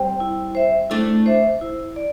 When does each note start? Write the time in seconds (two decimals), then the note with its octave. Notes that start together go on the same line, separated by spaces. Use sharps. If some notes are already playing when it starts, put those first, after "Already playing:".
Already playing: G3 C4
0.20 E4
0.55 C5 E5
0.90 A3 D4 E4
1.26 C5 E5
1.61 E4
1.96 D5